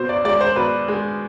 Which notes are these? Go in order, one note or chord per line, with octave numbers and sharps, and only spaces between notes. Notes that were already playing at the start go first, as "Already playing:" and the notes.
Already playing: B2 C5
D5
G#3 D5
C5
B2 B4
G#3